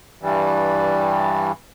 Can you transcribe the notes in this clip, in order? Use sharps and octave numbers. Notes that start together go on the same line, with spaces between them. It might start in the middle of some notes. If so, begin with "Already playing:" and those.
G2 E3 G3